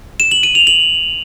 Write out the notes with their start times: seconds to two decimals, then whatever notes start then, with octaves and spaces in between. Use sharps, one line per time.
0.20 E7
0.31 F#7
0.43 D#7
0.55 F7
0.67 F#7